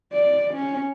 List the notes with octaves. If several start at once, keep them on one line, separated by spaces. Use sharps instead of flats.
D5
C#4